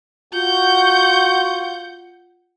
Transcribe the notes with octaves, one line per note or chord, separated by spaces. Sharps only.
F4 F#4 F#5 G6